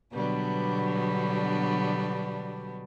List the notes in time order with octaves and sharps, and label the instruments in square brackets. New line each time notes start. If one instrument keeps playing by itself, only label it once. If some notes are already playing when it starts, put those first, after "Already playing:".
[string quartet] B2 D3 F#3 G3 B3 D4